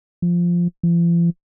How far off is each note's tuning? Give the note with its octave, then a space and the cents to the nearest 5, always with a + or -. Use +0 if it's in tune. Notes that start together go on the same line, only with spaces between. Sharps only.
F3 -5
F3 -45